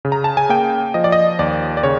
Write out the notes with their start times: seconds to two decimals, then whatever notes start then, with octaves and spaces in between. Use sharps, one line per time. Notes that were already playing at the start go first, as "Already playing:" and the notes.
0.05 C#3
0.12 A#5
0.24 A5
0.37 G#5
0.49 A#3 G5
0.94 F3 D#5
1.04 D5
1.12 D#5
1.39 D#2 D5
1.77 D5
1.83 C#3 C#5